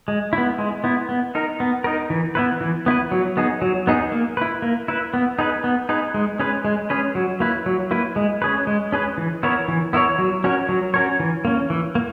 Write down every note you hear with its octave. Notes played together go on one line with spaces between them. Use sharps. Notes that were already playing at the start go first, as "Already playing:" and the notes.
G#3
E4
B3
G#3
B3 E4
B3
D#4 A#4
B3
D#4 A#4
E3
B3 E4 B4
E3
B3 E4 B4
F#3
B3 D#4 G#4
F#3
B3 D#4 G#4
A#3
E4 B4
A#3
E4 B4
B3
D#4 G#4 B4
B3
D#4 G#4 B4
G#3
C#4 G#4 B4
G#3
C#4 G#4 B4
F#3
A#3 E4 B4
F#3
A#3 E4 B4
G#3
C#4 G#4 B4
G#3
C#4 G#4 B4
E3
B3 E4 A#4 C#5
E3
B3 E4 A#4 C#5
F#3
C#4 F#4 A#4 C#5
F#3
C#4 F#4 A#4 C#5
E3
A#3 C#4
E3
A#3